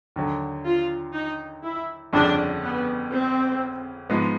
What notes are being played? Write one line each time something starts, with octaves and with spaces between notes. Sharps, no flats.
D#2 D3 F#3
F4
D#4
E4
G1 F2 C#3 D4
B3
C4
G#2 F3 G#3 B3